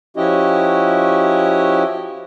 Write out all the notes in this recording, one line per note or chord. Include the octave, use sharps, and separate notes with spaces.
F3 C#4 E4 F#4 G4 D#5